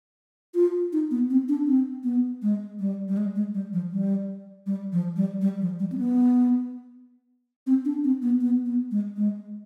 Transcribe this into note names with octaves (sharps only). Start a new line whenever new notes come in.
F4
D#4
B3
C4
D4
C4
B3
G#3
G3
G3
G#3
G#3
G3
F3
G3
G3
F3
G3
G3
F3
G3
C4
B3
C4
D4
C4
B3
B3
B3
G#3
G#3